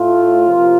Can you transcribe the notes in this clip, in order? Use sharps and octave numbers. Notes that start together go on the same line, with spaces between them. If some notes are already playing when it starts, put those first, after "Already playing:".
Already playing: A2 A3 F4
C3 F3 A#3